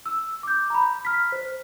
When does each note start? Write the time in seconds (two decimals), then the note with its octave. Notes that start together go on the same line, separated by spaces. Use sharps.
0.06 E6
0.43 D6 G6
0.70 A#5 B5
1.05 F6 B6
1.32 C5